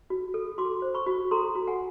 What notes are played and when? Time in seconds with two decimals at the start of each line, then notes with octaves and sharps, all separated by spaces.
0.10 F#4
0.34 A4
0.58 F#4 C6 D6
0.82 C5
0.94 B5 C#6
1.07 F#4
1.31 A4 A#5 C6
1.55 F#4
1.67 F#5 G#5